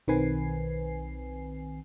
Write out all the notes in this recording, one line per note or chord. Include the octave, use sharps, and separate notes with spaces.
B1 D#3 C4 B4 G#5 C7